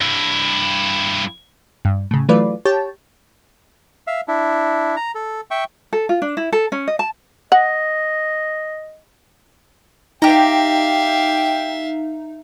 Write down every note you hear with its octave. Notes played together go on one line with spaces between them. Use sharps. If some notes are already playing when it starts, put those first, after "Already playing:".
G2 E4
G2
A2 C#3
E3 F#3 A3 F4 B4 D5
G4 C#5 G5 A5
E5 F5
D4 E4
A#5
A4
E5 G5 C#6
A4
F4
D4
E4
A4
C#4
D#5
A5
D#5 F#5
D#4 G4 E5 F5 G5 A#5